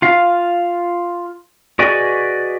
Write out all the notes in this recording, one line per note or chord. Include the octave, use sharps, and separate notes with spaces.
F4 F5
F#4 G#4 B4 D5 D#5 G#5